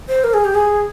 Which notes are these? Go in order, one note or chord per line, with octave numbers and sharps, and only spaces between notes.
C5
A#4
G#4
G4
G#4